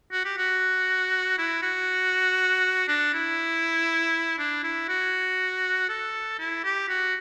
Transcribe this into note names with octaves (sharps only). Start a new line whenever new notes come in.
F#4
G4
F#4
E4
F#4
D4
E4
D4
E4
F#4
A4
E4
G4
F#4